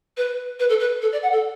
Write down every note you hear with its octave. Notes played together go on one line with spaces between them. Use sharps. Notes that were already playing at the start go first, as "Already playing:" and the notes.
B4
B4
A4
B4
A4
D5
F#5
A4